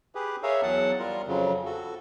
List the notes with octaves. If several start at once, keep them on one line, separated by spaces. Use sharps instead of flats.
G4 G#4 B4
G#4 A#4 C#5 E5 F5
E2 F#3 F#5 A5
G3 F4 A#4
F2 C#3 F#3
F#4 A4